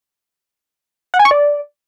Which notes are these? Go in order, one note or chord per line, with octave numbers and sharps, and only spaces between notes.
F#5
G#5
C#6
D5